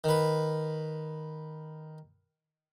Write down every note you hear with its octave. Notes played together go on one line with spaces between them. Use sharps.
D#3 B4